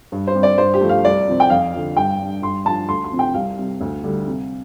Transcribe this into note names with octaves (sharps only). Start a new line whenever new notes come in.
G2
C5
G3 C4
D5
G2 C5
G4
F3 A3
F5
C2 D5
C3 F3 C4
G5
F2 F5
D3 F3
G2 G5
G3 D4
G2 C6
F3 D4 A5
D2 C6
C6
C3 F3 C4
G5
C2 F5
C3 G3
D2
D3 G3
C3